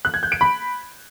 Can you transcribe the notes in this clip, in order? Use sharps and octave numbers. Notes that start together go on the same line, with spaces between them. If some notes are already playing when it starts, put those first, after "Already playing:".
F#6
G#6
G6
D7
B5